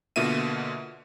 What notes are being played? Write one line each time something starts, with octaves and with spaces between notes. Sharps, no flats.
B2 D3 A#3 F4 E5 D#7